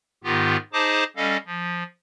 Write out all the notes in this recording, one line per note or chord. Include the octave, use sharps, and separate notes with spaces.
G#2 D#3 B3 F4 G4
D#4 G#4 C5 D#5 A5 D6
G3 C#4 A4 D#5 F5
F3